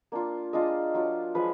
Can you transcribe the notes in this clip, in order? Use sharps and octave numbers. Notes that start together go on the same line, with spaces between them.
A#3 D4 F4
G#3 D4 F4 D#5
F#3 D4 F4
F3 G#3 B4